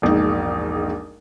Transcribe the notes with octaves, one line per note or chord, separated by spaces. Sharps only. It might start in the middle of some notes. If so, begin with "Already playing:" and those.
E1 A#1 G#2 D#4